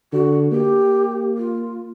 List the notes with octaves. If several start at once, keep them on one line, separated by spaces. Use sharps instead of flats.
D3 F#4
A#3 G4
F4